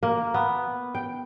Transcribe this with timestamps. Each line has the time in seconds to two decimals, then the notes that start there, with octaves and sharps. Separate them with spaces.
0.03 A#3
0.34 B3
0.95 G5